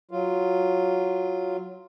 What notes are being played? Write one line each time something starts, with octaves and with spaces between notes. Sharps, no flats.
F#3 F4